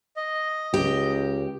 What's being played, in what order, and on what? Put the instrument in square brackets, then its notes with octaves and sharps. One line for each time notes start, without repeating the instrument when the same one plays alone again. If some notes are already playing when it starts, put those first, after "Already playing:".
[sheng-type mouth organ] D#5
[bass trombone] C#2 [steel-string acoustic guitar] G4